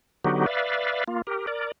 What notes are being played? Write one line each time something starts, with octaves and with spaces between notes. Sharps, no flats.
D3 F#3 B3 D#4 F#4 G4
B4 D5 E5 F5
A#3 F4
G4 A#4
A#4 D5